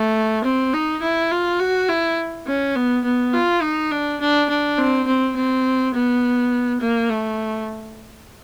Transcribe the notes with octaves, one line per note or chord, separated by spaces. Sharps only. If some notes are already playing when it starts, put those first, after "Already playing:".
Already playing: A3
C4
D#4
E4
F4
F#4
E4
C#4
B3
B3
F4
D#4
D4
D4
D4
C4
C4
C4
B3
A#3
A3